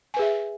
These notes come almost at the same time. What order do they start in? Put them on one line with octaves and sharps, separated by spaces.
G#5 B4 G#4 E5